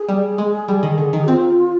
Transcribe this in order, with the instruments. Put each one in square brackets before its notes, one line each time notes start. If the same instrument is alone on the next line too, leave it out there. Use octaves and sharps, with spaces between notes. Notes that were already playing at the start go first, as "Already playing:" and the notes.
Already playing: [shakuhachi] G#4
[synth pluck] G3
G#3
G3
D#3
D3
D#3
[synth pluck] C4 [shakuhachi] F4